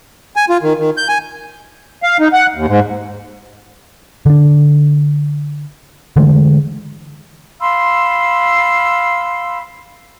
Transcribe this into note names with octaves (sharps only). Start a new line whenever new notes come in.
G#5
F4
D#3
D#3
G6
G#5
F5
D#4
F#5
D#2
G#2
D3 D4
D3 E3 G#3 A3
F5 B5 C6 E6